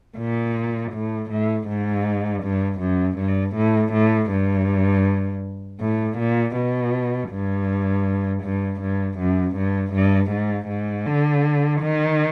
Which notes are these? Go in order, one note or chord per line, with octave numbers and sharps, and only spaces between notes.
A#2
A2
A2
G#2
G2
F#2
G2
A2
A2
G2
A2
A#2
B2
G2
G2
G2
F#2
G2
G2
G#2
G#2
D3
D#3